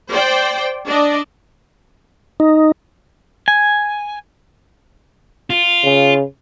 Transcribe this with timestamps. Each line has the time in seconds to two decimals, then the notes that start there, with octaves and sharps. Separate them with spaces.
0.10 C5 D5 G5
0.86 D4 D5 D#5
2.40 D#4
3.48 G#5
5.50 F4
5.84 C#3